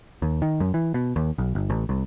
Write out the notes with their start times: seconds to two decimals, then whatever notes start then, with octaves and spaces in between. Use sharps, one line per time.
0.22 D#2
0.42 D#3
0.60 F#2
0.74 E3
0.94 B2
1.16 D#2
1.38 B1
1.55 G1
1.70 A1
1.89 C2